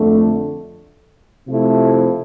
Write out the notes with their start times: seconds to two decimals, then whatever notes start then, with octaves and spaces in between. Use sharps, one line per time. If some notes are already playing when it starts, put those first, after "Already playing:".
Already playing: F2 D3 A3
1.47 C3 F3 A3 E4